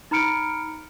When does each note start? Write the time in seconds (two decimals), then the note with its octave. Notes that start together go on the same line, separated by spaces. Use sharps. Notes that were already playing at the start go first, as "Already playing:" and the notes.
0.11 D#4 A#5 B5 F6 C#7 D7